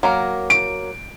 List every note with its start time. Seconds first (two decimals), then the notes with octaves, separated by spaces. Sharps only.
0.03 F#3 A#3 A#4
0.50 D7